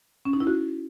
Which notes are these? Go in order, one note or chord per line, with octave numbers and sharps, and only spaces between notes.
C#4
D#4
E4
F#4